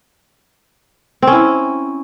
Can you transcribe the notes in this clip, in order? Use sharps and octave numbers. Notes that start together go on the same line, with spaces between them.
C4 C#4 E4